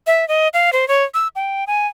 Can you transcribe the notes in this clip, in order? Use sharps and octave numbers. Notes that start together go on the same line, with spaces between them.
E5
D#5
F5
C5
C#5
E6
G5
G#5